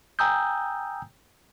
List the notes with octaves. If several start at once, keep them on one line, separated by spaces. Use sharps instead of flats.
G5 G#5 A#5 D#6 E6 G6